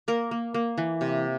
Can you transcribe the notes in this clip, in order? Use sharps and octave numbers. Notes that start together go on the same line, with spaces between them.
A#3 A#4
A#3
A#3
E3
C3